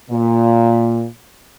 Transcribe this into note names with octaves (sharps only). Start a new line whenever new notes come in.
A#2